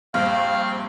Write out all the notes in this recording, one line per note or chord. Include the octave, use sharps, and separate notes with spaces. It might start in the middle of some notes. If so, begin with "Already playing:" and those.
A#1 G2 C4 F5